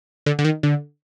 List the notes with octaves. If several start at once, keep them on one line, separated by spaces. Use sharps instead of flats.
D3
D3
D#3
D3